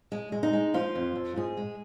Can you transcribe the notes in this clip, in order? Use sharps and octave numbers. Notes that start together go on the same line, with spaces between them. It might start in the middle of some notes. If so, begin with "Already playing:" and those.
G#3
G#3
D#4
G#3
F3 F4
F2
F2
G#2 G#4
G#3